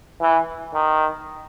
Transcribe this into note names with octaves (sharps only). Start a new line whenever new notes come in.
E3
D#3